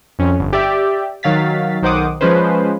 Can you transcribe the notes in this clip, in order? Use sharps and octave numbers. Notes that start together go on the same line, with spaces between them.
F2 C#4
G1
G4 D5 E5
D#3 F#3 F5 A6 B6
B1 D#3 C5 F#5 D6 D#6
F3 G#3 C#4 B4 C5